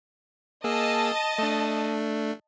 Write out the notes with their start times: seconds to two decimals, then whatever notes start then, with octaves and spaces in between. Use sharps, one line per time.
0.64 A#3 G#4 D#5 A5 E6
1.38 A3 D4